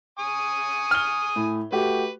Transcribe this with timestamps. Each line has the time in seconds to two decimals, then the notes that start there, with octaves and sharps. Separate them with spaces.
0.19 G#5 C#6 D#6
0.91 F6 G7
1.36 A2
1.72 A3 F#4 G4 B4